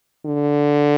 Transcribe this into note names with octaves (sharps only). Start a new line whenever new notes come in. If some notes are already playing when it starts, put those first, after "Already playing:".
D3